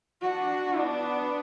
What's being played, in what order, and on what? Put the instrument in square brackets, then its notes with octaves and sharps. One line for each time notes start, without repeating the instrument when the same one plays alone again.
[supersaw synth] D4 [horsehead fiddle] F#4
[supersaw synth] B3 [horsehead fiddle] D4